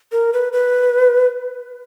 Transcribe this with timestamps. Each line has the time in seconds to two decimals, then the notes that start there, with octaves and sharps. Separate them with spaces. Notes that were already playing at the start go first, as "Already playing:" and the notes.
0.12 A#4
0.33 B4
0.53 B4